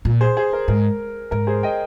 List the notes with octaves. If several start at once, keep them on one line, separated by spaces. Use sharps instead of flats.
A#2
G#4 C5
G#4 C5
A#4
G#2 A#4
G#2 A#4
G#4 C5
D#5 G5